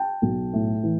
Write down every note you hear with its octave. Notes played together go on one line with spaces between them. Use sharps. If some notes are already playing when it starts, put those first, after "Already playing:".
Already playing: G5 A5
B1
A2
E3